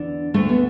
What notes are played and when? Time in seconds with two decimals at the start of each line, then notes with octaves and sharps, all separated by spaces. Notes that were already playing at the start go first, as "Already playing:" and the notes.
Already playing: E2 D3 D4
0.34 D2 D3 A3
0.49 B3